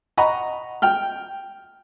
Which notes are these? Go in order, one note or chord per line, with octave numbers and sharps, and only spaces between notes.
D#5 F#5 A#5 B5 C#6
G5 F6